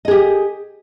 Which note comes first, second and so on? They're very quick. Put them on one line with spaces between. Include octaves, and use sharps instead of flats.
D#5 G#4 G4